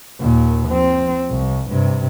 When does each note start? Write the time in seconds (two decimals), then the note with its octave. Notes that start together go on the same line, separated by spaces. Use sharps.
0.21 D#2 A#2
0.69 F3 C4
1.30 C2
1.71 G2 C3